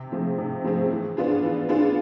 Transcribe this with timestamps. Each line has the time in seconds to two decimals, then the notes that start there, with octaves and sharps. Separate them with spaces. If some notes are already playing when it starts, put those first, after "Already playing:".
Already playing: C3
0.12 F3 A3 C4 G#4
0.38 C3
0.64 F3 A3 C4 G#4
0.90 E3
1.17 B3 D4 F4 G#4
1.43 E3
1.69 B3 D4 F4 G#4